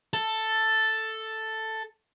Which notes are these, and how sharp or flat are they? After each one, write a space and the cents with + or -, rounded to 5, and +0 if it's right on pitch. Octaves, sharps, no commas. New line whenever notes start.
A4 +5